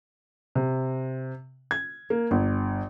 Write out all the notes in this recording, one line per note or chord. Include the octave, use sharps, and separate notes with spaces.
C3
G#6
A#3
G1